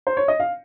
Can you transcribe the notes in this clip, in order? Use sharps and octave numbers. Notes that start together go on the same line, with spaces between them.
C5
C#5
D#5
F5